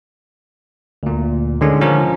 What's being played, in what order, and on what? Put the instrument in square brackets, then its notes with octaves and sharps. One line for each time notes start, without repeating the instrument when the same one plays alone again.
[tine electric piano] D2 A#2
[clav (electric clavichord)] D3 [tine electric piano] D#3 G#3 C#4
[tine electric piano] F3 C#4 A#4